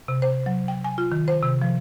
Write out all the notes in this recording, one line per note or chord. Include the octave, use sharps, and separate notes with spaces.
C3
C5
F#3
G5
G#5
F4
D#3
C5
C3
F3